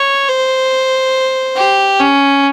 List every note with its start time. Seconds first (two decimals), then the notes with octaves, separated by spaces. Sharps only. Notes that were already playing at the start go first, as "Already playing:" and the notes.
Already playing: C#5
0.29 C5
1.57 G4
2.00 C#4